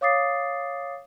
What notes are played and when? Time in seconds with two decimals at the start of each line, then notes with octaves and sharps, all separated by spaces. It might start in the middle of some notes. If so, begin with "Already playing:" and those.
0.01 C#5 F5 D6 D#6 A6 C7